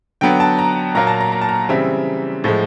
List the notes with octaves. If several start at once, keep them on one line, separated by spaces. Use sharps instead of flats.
D3 F#3 B3 G5
A5
A#5
A#2 F#3 A#3 A#5
A5
A#5
A#5
A5
A#5
C#3 E3 G3 C4 E5
A2 F3 G#3